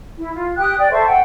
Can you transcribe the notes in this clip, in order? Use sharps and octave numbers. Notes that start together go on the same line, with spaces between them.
E4
F4
G4 G5 D#6 F#6
D5 G5
A4 C5 E5 C#6
F#5 G5